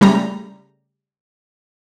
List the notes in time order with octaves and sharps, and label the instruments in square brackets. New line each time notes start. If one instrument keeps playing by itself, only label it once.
[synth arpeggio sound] C#3 G3 A3 A#5